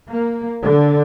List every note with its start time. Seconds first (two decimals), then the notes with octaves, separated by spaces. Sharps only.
0.11 A#3
0.64 D3